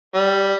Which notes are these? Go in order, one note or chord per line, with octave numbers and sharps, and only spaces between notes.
G3